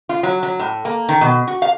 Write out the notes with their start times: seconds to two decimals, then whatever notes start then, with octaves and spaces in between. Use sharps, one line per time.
0.09 F4
0.23 F#3
0.43 F#3
0.59 A2
0.85 A#3
1.09 D#3
1.21 B2
1.47 F#4
1.62 F5